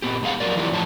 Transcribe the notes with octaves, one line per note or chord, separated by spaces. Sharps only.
A#2 B3 G4
B2 G#3 G#4 F5 F#5
F2 F#3 A#4 D5
E3 F#3 E4 F4 G4 D5
A2 F3 C#5 A5